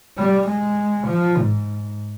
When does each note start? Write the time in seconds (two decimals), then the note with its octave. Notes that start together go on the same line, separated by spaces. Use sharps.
0.18 G3
0.48 G#3
1.08 F3
1.38 G#2